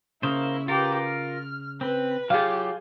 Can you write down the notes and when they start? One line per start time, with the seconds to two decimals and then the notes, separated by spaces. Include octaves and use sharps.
0.23 C#3 A#3 E4 C5
0.68 F4 G4 A#4 B4
1.06 F6
1.81 C4 B4
2.30 F#3 F4 G4 G#4 F5